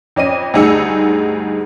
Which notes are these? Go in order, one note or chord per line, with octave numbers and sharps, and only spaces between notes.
F2 C#4 D#5 D#7
D2 G2 D#4 G#4 E6 C#7